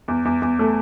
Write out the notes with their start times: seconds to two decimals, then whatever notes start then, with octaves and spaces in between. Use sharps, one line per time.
0.08 E2
0.25 E2
0.42 E2
0.59 A3